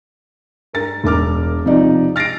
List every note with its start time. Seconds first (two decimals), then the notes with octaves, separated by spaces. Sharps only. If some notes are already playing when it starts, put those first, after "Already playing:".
0.73 G2 A#4 A6
1.04 E1 A#4 D6 F6
1.66 C3 F3 D#4 D5
2.16 F6 A6 A#6 C7 D7